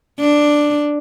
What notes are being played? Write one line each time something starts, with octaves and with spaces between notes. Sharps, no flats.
D4